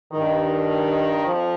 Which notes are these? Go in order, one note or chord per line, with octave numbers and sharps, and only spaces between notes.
G2 D#3
F2 F3